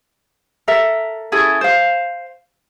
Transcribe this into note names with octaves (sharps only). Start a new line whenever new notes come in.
A4 A#4 E5
C#4 E4 G#4 A4
C5 F5